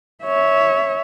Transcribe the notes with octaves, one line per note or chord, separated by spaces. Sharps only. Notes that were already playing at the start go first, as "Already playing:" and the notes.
C#5 E5